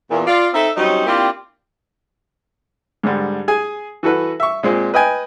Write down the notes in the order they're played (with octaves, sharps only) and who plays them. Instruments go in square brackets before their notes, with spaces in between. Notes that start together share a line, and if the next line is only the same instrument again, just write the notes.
[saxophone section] E2 A#2
F4 D5
C4 D#4 A4 E5
F#3 G3 C4 C#4 D#4
A#3 C4 D4 E4 F4 G4
[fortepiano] G#2 D3 G3
G#4 G#5
E3 F#4 A4 B4
E5 C#6
A#2 G#3 C4
B4 D#5 G5 G#5